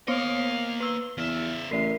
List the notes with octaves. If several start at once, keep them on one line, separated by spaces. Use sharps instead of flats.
A#3 B3 C5 C#5 D#5 F5
B4 E6 G7
E2 C#3 E5 F6
A1 A#4 D5 E5 C7